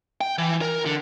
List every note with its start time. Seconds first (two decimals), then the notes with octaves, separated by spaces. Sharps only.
0.21 G5
0.38 E3
0.61 A#4
0.86 D3